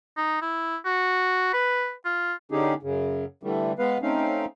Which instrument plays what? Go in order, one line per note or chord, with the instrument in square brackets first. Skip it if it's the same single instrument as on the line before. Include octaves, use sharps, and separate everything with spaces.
[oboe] D#4
E4
F#4
B4
F4
[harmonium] D3 C#4 D#4 G4 G#4
F#2 C#3
D3 E3 G3 A3
G#3 B3 B4 F5
A3 C4 C#4 D#4 F5